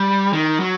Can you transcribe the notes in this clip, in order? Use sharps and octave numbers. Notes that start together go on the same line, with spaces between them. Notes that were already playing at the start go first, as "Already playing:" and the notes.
Already playing: G3
D#3
F#3